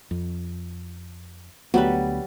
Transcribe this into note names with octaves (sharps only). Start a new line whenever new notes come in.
F2
D2 F#3 G3 A3 B3 B4